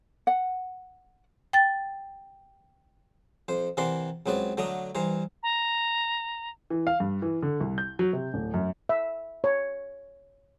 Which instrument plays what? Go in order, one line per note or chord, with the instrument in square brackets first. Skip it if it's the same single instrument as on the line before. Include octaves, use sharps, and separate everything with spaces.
[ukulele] F#5
[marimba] G5 A6
[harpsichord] F2 C5
C3 E3 A#4 D5 F#5 C6
C#2 F#3 C4 B4 D5
D3 F#3 A3 D4 A#5 D#6
G2 E3 C5 A#5
[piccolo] A#5
[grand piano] E3
F5
G2
E3
D3
C2
G6
F#3
C3
D1
F#2
[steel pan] E5
C#5